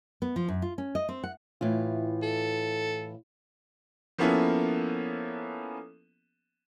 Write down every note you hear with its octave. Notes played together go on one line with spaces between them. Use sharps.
B3
F3
F#2
F4
C#4
D#5
C4
F#5
A2 E3 F4
A4
F3 A#3 B3 C#4 E4 A4